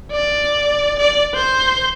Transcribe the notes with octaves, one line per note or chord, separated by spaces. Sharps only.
D5
D5
C5